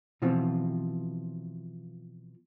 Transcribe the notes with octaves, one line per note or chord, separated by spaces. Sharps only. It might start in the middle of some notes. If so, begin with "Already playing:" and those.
B2 E3 F3 C4 F4